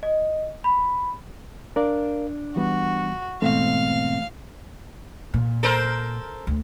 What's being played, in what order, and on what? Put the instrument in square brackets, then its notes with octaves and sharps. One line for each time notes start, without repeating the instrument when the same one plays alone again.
[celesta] D#5
B5
[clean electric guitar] D4 [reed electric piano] A#4 D5 F5
[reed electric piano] E3 G3 B3 [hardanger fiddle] F#4
[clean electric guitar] G#2 B2 C4 [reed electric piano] E3 A3 [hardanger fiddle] F5
[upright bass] A#2
[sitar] A4 A#4 C5
[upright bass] D2